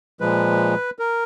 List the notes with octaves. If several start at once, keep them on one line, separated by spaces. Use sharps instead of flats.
A#2 F3 G#3 B4
A#4